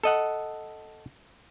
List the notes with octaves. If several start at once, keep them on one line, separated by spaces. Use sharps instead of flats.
A4 D#5 F#5